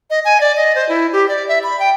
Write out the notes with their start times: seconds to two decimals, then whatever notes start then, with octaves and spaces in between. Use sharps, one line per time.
0.10 D#5
0.25 G#5
0.41 D5
0.56 D#5
0.75 C5
0.89 E4
1.13 G4
1.29 D5
1.48 E5
1.63 B5
1.79 G5